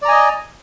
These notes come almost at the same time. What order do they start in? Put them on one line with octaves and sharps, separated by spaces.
D5 A#5 G#5 D#5